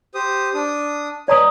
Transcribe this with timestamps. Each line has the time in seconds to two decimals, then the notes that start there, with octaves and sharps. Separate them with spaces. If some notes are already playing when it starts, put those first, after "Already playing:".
0.15 G4 C5 D#6
0.54 D4 D#6
1.28 B4 D5 D#5 A#5 D#6